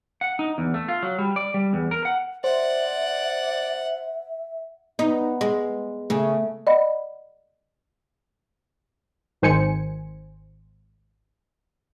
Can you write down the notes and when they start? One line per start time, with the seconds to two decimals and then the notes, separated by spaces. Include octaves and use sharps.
0.21 F#5
0.39 D#4
0.58 E2
0.74 A3
0.88 F4
1.03 F#3
1.19 G3
1.36 D5
1.54 G3
1.73 E2
1.91 A#4
2.05 F#5
2.44 C5 D5 E5 F#5
4.99 B3 D#4
5.41 G#3
6.10 C#3 A3
6.67 D5 D#5 F#5 B5
9.42 G#1 D#3 C5 G#5 C#7